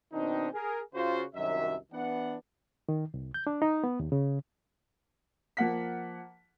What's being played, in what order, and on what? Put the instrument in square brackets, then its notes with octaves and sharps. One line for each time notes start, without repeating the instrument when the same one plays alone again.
[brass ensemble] B2 D#3 C4 D4 D#4
G#4 A#4
C#3 F4 F#4 C5
C2 F#2 D#3 F#3 D#5 E5
E3 B3 D4 F#5
[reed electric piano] D#3
C2
G6
D4
D#4
B3
D#2
C#3
[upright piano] F3 A#3 F#5 B6